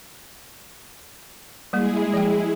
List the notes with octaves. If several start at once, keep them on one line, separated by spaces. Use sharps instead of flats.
G3 G#3 A#3 E4 G#4
F3 G5